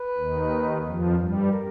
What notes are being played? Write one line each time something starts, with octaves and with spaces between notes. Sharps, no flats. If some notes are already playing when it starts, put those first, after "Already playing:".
Already playing: B4
D#2 D#3
F2 F3
G2 G3
A#4